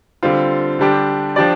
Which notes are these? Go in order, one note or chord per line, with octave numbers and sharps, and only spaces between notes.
D3 G3 C4 F4
D3 G3 D4 G4
F3 D4 G4 D5